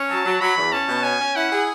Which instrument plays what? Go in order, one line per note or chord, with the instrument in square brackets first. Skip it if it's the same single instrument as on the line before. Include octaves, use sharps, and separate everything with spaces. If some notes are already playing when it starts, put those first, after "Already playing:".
Already playing: [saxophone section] C#4
[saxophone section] F#3 [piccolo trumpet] A5
[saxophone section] F#3
[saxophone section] F#3 [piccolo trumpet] B5
[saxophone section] E2
[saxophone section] C#4 [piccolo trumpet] A5
[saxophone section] B2
[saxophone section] C#4 [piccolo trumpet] G#5
[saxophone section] C#4
[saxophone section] E4 [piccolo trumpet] F#5
[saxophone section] G#4